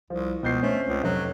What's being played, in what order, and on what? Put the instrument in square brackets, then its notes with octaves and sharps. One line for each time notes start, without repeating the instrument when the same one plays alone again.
[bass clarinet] C2 [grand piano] F3
[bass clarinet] C#2 [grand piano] B2 G6 C7
[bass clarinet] A3 [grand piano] C4 C#4
[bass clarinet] C#2
[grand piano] F1 [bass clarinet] F#3